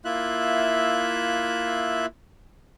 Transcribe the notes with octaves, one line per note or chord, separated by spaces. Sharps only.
A#3 E4 F4 E5 F#6